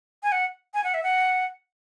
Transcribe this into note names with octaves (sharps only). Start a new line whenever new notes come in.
G#5
F#5
G#5
F#5
E5
F#5